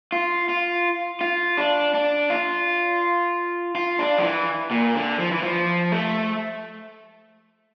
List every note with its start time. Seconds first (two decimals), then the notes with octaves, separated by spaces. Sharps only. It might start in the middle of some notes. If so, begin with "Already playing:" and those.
0.12 F4
0.49 F4
1.21 F4
1.58 D4
1.94 D4
2.30 F4
3.75 F4
3.99 D4
4.18 F3
4.23 E3
4.71 A#2
4.95 D3
5.19 F3
5.31 E3
5.43 F3
5.92 A3